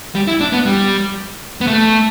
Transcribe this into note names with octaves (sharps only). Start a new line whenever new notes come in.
G3
E4
D4
B3
G3
B3
A3